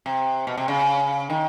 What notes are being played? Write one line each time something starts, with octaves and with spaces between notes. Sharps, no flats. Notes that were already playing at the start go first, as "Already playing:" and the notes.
C3
B2
C3
C#3
D#3